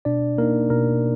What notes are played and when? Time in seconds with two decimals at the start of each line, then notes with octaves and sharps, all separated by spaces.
0.05 B2 D4 D5
0.38 A#3 D#4 A#4
0.70 B2 A#4